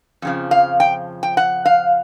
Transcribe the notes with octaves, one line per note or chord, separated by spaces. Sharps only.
F2 C#3 F3
F5
G5
G5
F#5
F5